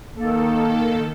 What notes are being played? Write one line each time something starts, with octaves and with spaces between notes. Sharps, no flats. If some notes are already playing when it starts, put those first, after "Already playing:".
D#3 A#3 A4